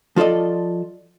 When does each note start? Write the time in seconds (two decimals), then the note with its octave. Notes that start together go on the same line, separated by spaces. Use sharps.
0.16 F3 F4 A4 D5 D#5